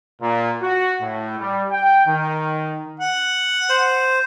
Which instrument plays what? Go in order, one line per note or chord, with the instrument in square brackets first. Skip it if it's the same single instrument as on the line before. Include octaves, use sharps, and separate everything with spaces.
[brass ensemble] A#2
F#4
A2
G3
G5
D#3
[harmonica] F#5
[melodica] C5